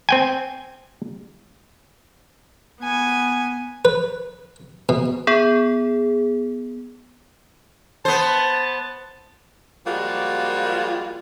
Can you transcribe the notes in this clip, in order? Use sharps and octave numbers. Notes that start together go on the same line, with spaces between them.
C4 G5 G#5
B3 G#5
B4
B2
B3 G#4
B3 C5 A5
F3 G3 G#3 A#3 F4 F#4